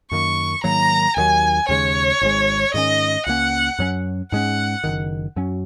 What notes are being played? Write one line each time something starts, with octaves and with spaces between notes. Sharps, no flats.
F#2 D#3 A#3 C#6
G#2 D#3 F#3 A#3 A#5
D#2 D#3 F#3 G#5
D#2 C#3 G#3 C#5
G#1 G#2 G#3
G#2 D#3 A#3 C#4 D#5
C#2 C#3 A#3 C#4 F#5
F#2 F#3 C#4
G#2 G#3 C#4 F#5
F#1 F#2 D#3
F#2 F#3 C#4